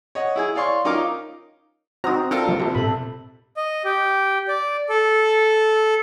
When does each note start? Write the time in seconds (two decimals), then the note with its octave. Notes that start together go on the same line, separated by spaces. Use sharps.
0.15 C#5 D#5 F#5
0.36 E4 G#4 G#5
0.55 C#5 D5 F5 C6 C#6
0.85 C#4 D#4 F4 A#4 D6
2.04 C4 D#4 F#4 C5 A#5 D#6 F6
2.31 D4 F4 A4 A#4
2.48 C3 F3 G3 A#3
2.60 A#1 F4 A5
2.75 G#1 A#2 A4 B5
3.57 D#5
3.85 G4
4.48 D5
4.89 A4